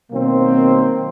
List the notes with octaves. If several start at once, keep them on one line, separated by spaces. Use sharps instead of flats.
B2 D#3 F#3 A#3 C4